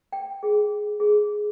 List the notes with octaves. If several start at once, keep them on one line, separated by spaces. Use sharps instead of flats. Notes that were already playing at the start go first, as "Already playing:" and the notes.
G5
G#4
G#4